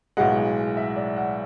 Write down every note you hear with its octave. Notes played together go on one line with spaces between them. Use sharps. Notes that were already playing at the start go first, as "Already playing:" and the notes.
B1 A2 G#3 F#5
E5
D5
F#5